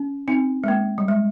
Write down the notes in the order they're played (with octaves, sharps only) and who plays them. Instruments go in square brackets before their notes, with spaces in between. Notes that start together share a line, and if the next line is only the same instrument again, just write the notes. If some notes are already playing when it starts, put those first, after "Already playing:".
Already playing: [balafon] C#4
C4 D#4
G#3
A#3
G3
G#3